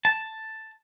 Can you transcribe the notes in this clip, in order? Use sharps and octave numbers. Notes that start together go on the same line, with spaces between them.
A5